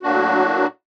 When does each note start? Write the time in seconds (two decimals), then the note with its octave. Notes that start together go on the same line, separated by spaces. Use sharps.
0.02 A2 F#3 A#3 D4 F#4